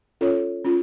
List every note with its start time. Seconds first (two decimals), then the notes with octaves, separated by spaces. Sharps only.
0.21 C#4 F4 A4 C#5
0.64 C#4 F4